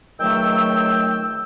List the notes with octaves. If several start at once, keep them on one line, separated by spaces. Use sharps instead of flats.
C#2 D#3 F#3 A3 G5 E6